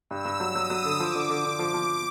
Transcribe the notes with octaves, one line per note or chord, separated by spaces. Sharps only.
G2 E6
G2
F#3
F#3 D#6
F#3
D3
F3 D6
D3
D3
D3
F3
F3